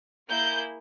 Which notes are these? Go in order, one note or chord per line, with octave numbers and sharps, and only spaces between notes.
A#3 E4 G#4 G6